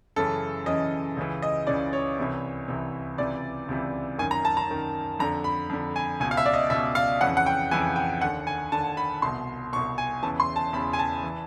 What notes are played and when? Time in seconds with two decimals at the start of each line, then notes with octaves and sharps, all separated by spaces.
0.16 F#2 C#3 E3 A4
0.66 F#2 C#3 E3 D#5
1.17 C#2 C#3 E3
1.42 D#5
1.67 C#2 C#3 E3 D5
1.93 C#5
2.18 C2 C3 E3
2.68 C2 C3 E3
3.18 C#2 C3 E3 D5
3.69 C#2 C3 E3
4.18 F#2 D#3 G#5
4.31 A#5
4.45 A5
4.57 A#5
4.69 F#2 D#3
5.19 F2 D3 A#5
5.44 B5
5.69 F2 D3
5.96 G#5
6.20 C#2 B2 G#5
6.31 F5
6.37 E5
6.46 D5
6.54 D#5
6.70 C#2 B2 E5
6.95 F5
7.21 F2 C#3 E3 F#5
7.37 F#5
7.46 G5
7.71 F2 C#3 E3 G#5
7.96 G5
8.21 D#2 D3 F#5
8.47 G#5
8.72 D#2 D3 A5
8.97 B5
9.22 C2 B2 C6
9.72 B2 C#6
9.76 C2
9.98 G#5
10.23 E2 C#3 E3 A5
10.40 C6
10.56 A5
10.73 E2 C#3 E3 B5
10.93 G#5
10.99 A5
11.23 E3